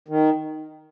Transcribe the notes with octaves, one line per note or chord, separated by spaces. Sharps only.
D#3